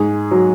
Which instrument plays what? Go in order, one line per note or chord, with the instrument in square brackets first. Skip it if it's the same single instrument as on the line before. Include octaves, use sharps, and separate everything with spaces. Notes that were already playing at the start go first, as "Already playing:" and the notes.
Already playing: [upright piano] G#2 G#4
F#3